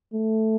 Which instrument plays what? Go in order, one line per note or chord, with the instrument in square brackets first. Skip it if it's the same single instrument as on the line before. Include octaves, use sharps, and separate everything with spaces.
[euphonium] A3